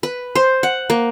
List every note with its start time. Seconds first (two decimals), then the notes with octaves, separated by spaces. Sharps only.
0.03 B4
0.35 C5
0.63 F#5
0.90 A#3